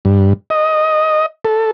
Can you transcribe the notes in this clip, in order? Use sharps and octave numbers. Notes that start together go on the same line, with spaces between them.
G2
D#5
A4